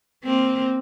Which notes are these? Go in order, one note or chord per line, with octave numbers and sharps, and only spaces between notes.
A#3 C4